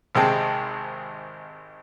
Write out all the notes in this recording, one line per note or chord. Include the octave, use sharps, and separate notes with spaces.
G#1 C3 G#3 G5 A5